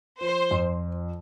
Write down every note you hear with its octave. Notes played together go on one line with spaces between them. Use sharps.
F3 C5
F2